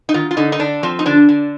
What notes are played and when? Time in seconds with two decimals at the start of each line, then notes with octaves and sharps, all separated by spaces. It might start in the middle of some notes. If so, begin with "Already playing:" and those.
0.09 D#4
0.14 D#3 F4
0.31 F4
0.37 D3 D#4
0.52 D#4
0.59 D3 D4
0.83 F3 C4
0.99 D#4
1.06 D3 D4
1.29 D3